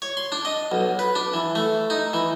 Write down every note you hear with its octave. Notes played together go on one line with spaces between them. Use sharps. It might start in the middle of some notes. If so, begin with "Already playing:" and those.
C#5
C6
D4
D#5
B1
B4
D4
E3
A3
D#4
E3